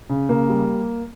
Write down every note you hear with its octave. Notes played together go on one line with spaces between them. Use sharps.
C#3
C#3 A#3
G3